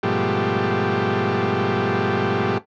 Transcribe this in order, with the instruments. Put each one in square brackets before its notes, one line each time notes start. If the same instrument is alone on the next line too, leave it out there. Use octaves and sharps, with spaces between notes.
[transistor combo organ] G#2 B2 F3 G3 A3 G4